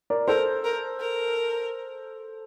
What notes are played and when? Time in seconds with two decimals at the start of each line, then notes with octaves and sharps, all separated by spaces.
0.10 A#4 D5
0.28 A4 A#4 C5
0.64 A#4
1.00 A#4